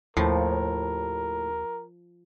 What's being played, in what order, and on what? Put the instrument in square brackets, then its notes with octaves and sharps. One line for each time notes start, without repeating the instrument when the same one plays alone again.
[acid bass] D#2 [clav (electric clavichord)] A2 [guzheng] F3 [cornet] A#4